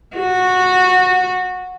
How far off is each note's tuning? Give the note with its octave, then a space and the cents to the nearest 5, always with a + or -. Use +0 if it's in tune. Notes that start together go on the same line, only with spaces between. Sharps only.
F#4 -15